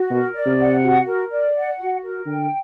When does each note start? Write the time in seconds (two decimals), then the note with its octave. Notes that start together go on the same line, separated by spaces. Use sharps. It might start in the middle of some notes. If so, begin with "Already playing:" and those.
Already playing: F#4
0.10 B2 A#4
0.34 D5
0.46 C3
0.58 F#5
0.82 F#4
1.06 A#4
1.30 D5
1.54 F#5
1.78 F#4
2.03 A#4
2.26 D3 G5